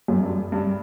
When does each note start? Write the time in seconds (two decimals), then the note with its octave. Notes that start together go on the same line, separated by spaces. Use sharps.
0.08 F#2
0.23 G2
0.52 G2